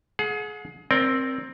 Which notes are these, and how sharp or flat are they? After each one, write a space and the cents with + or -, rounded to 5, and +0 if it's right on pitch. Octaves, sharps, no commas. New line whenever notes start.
G#4 +30 F#5 -30
C4 +10 A#4 +25 D5 -20